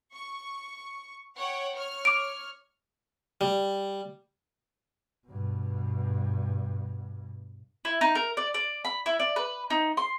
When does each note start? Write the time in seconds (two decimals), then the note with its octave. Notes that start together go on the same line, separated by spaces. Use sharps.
0.13 C#6
1.38 C#5 F#5 G5
1.75 C#5 F6
2.05 D6 D7
3.41 G3
5.27 G2 B2
7.85 E4
8.01 D#4
8.15 A#4
8.37 D5
8.54 D5
8.85 B5
9.06 E4
9.19 D5
9.36 B4
9.70 D#4
9.97 C6